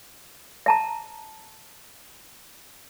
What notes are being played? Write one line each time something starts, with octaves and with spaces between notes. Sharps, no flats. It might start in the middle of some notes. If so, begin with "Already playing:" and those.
E5 A5 A#5